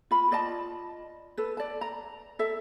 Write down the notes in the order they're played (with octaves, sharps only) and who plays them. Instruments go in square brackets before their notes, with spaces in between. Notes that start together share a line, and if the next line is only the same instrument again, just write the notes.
[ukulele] F4 B5
F4 D5 D#5 A5
A4 B4
D5 A5
A#5
A4 E5